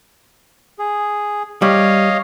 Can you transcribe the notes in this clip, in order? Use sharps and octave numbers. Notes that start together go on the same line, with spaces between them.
G#4
G3 C#5 D#5 F5